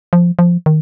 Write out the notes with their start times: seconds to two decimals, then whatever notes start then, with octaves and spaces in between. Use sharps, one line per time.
0.13 F3
0.39 F3
0.66 D#3